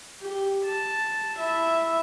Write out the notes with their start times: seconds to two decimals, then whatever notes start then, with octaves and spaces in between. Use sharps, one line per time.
0.22 G4
0.65 A5
1.37 E4 E5